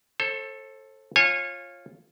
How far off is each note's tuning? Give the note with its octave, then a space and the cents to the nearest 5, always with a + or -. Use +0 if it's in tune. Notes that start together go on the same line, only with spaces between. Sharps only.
A4 +0 C5 +40
F4 +0 C#5 -25 G#5 -15